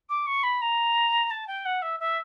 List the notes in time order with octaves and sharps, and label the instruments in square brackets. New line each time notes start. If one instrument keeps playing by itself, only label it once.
[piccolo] D6
C#6
B5
A#5
A5
G5
F#5
E5
E5